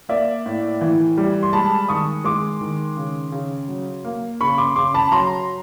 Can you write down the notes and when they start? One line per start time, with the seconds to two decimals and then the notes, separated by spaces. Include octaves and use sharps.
0.09 A#3 D5 E5
0.46 A2
0.81 E3
1.18 G3
1.43 C6
1.53 G#3 A5 B5
1.89 D#3 C#6 D#6
2.24 G#3 C6 D6
2.61 D#3
2.97 C#3
3.32 C#3
3.68 F#3
4.05 A#3
4.41 C#3 B5 C#6
4.58 C6 D6
4.76 C#3 C6 D6
4.94 A5 B5
5.12 F#3 A#5 C6